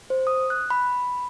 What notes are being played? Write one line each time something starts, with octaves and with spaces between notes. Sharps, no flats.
C5
D#6
F#6
B5